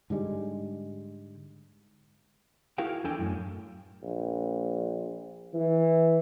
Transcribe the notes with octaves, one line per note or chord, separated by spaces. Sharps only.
G#2 D3 G3 G#3
E4 F#4 G#4 A#4 F5 G5
E2 D4 E4 A4 G5 G#5
F#2 A2
A#1
E3